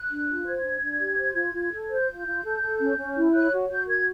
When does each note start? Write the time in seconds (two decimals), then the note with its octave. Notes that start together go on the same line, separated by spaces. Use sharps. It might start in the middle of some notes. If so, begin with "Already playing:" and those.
Already playing: F#6
0.11 D4
0.28 F4
0.46 C5 G#6
0.64 D4
0.82 D4
1.00 G4
1.18 C5
1.36 F4
1.54 F4
1.72 A4
1.90 C5 G6
2.08 F4
2.26 F4
2.44 A4
2.62 A4
2.80 C#4
2.98 C#4
3.16 E4
3.34 C#5 F#6
3.52 F#4
3.70 F#4 G6
3.88 A#4 G#6